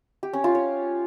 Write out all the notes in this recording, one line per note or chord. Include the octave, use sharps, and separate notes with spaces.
G4
C#4
F4
C#5